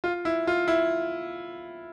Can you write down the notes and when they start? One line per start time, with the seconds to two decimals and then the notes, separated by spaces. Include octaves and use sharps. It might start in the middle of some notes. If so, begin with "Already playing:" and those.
0.04 F4
0.25 E4
0.47 F4
0.68 E4